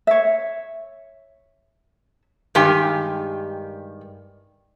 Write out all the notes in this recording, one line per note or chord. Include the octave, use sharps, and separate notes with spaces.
C#5 E5
G2 D#3 G#3 G4 G5 G#5